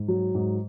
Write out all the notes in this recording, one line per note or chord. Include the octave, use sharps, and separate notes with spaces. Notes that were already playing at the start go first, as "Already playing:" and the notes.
Already playing: G#2
F#3
G#2